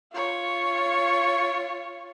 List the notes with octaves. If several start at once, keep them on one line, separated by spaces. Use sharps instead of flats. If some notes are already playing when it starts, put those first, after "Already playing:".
F4 C#5